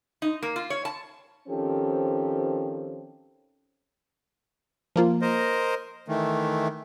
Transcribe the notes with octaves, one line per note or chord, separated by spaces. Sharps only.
D#4
A#3
F4
C#5
A5
D#3 F3 C4 C#4 G4 A4
F3 A#3 F4
A#4 C5 D#5
D#3 E3 A3